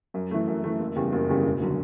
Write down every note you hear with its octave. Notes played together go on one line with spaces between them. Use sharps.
F#2
E3 A3
F#2
E3 A3
F#1
E2 C#3 G3
F#1
E2 C#3 G3
E1
D3 F#3